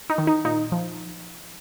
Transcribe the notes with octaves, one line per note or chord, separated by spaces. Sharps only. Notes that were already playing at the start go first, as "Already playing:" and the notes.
D#4
D#3
D#4
A#2 D#4
F3